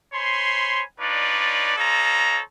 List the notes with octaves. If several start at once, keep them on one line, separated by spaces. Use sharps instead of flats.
C5 C#5 G#5 B5 C6
D4 D#4 F4 B4 C#5 D5
F4 A4 C5 C#5 D#5 A#5